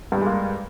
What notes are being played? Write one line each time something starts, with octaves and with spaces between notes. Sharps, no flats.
G2 G3 G#3 A#3